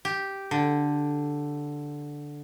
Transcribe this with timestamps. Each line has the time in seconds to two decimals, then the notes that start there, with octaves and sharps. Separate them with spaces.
0.05 G4
0.51 D3